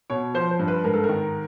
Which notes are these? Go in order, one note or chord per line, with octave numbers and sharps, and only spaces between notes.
B2 C#5
F3 C5
C5
G2
B4
G#2 A#4
A4
A#4
D#3